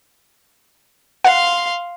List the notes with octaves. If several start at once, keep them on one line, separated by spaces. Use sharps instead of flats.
F5 F#5 C6